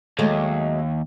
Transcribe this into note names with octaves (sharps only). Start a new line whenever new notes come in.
D#2 F#3 G#3 A3